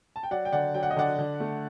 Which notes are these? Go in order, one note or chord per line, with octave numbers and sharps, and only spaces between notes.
A5
G5
F#3 D5 F#5
G5
D3 D5 F#5
F#3 G5
F#5
D#5
D3 D5 F#5
D3
A3